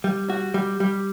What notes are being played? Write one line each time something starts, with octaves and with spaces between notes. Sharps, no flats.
G3
F#4
G3
G3